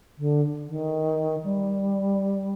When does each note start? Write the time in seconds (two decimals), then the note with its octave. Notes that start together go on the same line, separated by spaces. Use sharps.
0.18 D3
0.68 D#3
1.44 G3